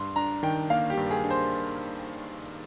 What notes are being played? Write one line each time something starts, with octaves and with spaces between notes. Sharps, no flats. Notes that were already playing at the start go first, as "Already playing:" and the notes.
Already playing: G2 C6
D4 A#5
D#3 G5
A#3 F5
G4
G2
G#4
D4
C5